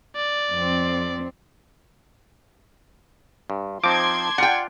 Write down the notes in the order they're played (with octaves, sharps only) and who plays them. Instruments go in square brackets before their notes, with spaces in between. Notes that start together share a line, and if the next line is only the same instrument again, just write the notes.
[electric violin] D5
[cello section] F2 C4
[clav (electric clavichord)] G2
[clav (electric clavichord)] F3 C4 D#4 [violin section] A5 C6 G#6 [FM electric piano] D6
[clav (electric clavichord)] F4 D5 [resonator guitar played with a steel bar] F#5 G5